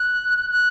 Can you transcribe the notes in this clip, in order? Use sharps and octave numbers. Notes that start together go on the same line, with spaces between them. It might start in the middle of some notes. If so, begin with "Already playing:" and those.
Already playing: F#6
F#6